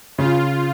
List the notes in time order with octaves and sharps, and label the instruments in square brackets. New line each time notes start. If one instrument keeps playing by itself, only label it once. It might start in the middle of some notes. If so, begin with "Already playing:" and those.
[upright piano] C#3 [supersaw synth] F4